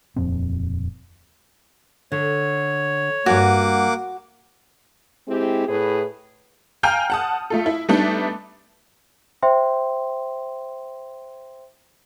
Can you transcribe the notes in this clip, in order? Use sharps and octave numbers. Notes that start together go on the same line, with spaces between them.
D#1 F2 A#2 C4
D3 C#5
G2 A#3 F#4 F#5 G#5 D6
G#3 C4 E4 G4
A2 E4 G#4 B4
F5 G5 G#5 A#5 F6 G6
F#5 A5 D#6
A3 F4 A4
E4
G3 A3 B3 D4 D#4
C5 E5 G5 C6